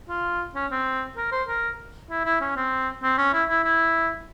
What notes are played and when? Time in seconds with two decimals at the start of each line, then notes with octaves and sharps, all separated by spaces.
0.09 F4
0.55 C#4
0.71 C4
1.17 A#4
1.32 C5
1.48 A#4
2.10 E4
2.25 E4
2.41 C#4
2.56 C4
3.03 C4
3.18 C#4
3.33 E4
3.49 E4
3.64 E4